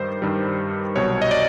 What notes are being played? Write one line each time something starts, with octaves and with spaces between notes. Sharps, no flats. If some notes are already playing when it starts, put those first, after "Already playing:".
Already playing: G2 D#3 G3 C5
G2 D#3 G3
C2 B2 F#3 C#5
D#5
D5